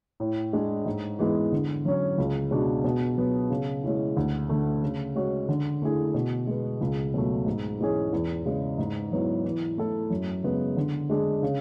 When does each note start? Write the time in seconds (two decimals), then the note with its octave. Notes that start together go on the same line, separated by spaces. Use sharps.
0.20 A2
0.53 G#3 D4 G#4
0.86 G#2
1.19 E3 G#3 B3 E4
1.52 D3
1.85 F#3 C#4
2.18 C#2
2.51 B2 G#3 D4 F#4
2.84 B2
3.17 F#3 B3
3.50 C#3
3.83 G#3 C#4 E4
4.17 D2
4.49 D3 A3
4.83 C#3
5.16 G#3 C#4 F#4
5.48 D3
5.82 A3 E4 G#4
6.14 B2
6.47 G#3 B3
6.81 C#2
7.14 B2 F#3 A3
7.46 G#2
7.79 E3 G#3 C#4 G#4
8.12 E2
8.45 C#3 G#3
8.78 G#2
9.12 F#3 B3 E4
9.45 E3
9.78 A3 E4 A4
10.10 F#2
10.44 C#3 G#3 B3
10.77 D3
11.10 G#3 D4 G#4
11.43 C#3